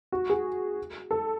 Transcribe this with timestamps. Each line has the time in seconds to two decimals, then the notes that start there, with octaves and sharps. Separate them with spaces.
0.12 F#4
0.30 G#4
1.11 A4